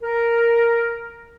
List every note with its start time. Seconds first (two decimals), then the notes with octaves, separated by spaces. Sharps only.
0.03 A#4